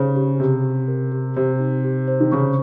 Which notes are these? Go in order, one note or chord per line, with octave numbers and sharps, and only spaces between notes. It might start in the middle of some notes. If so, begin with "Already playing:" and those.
Already playing: C#3 D#4 G4 C5
G4
C3 G4
G4
A#4
G4
C3 C5
D#4
G4
C5
D#3
C#3 C#6